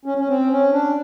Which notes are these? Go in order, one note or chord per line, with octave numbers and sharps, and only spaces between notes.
C#4
C#4
C4
C#4
D4